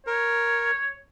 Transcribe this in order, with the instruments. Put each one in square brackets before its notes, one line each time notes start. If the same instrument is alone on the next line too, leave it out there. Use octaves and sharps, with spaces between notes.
[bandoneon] A#4 [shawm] C#5